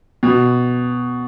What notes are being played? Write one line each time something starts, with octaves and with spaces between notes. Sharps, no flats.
B2